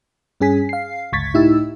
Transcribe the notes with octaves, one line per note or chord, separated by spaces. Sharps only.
G2 C#4 G#4 G#5 B6
F5 C7
G1 C#2 C#6 G#6 A6 B6
A2 D#4 E4 G4 E6